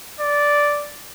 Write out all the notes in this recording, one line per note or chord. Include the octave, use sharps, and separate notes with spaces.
D5